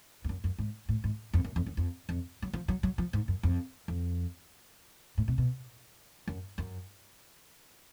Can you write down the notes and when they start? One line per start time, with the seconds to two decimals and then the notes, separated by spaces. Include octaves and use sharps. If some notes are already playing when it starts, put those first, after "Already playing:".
0.24 F2
0.29 F#2
0.44 F#2
0.58 G#2
0.89 A2
1.04 G#2
1.33 F2
1.44 F#2
1.56 F2
1.66 F#2
1.77 F2
2.09 F2
2.42 F#3
2.53 F3
2.68 F#3
2.83 F#3
2.98 F3
3.13 G#2
3.28 F#2
3.43 F2
3.88 F2
5.18 A2
5.28 B2
5.38 B2
6.27 F#2
6.58 F#2